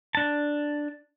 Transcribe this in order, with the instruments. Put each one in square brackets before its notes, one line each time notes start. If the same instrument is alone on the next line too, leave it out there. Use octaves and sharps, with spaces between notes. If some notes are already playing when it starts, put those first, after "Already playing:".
[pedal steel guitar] D4 A5